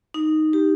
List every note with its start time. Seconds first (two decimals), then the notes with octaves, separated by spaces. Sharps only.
0.14 D#4
0.53 G4